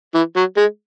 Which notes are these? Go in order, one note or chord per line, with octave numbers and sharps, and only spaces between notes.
E3
F#3
G#3